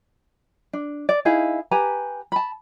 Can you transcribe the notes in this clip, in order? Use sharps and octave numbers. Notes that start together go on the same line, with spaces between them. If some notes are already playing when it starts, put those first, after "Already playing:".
D4
D5
D#4 E4 G#4 F5
G4 B4 G#5 A#5
A5 B5